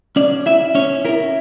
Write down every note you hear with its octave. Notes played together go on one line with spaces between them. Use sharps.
C#4 D5
E4 E5
C#4 C#5
E4 A#4